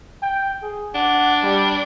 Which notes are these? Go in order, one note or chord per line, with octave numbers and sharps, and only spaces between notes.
G5
G#4
D4 F#5
G3